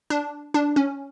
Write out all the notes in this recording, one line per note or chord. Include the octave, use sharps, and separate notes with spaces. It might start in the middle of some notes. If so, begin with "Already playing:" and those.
D4
D4
C#4